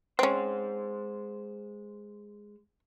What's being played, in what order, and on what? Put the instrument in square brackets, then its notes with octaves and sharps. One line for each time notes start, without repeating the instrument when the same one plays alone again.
[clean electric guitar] G#3 C5 [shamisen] C4 C#4